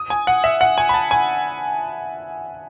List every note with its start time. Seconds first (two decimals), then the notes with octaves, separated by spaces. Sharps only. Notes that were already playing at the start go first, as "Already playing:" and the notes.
Already playing: D#6
0.10 G#5
0.27 F#5
0.44 E5
0.61 F#5
0.78 G#5
0.89 B5
0.94 A5
1.11 G#5